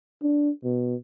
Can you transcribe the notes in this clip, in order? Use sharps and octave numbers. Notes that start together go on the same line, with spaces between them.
D4
B2